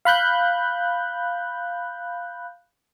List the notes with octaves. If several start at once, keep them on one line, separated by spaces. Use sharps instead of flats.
F5 B5 F#6 G6